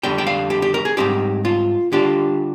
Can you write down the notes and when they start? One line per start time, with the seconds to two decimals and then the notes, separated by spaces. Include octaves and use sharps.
0.03 F2 D3 G3 G5
0.18 G5
0.27 F5
0.50 G4
0.62 G4
0.74 A#4
0.85 G#4
0.97 G#2 G3 C4 D#4 G4
1.45 F4
1.92 D3 G3 D4 F4 G4